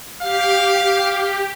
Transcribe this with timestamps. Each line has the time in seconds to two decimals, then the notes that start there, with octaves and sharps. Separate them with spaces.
0.22 G4 F5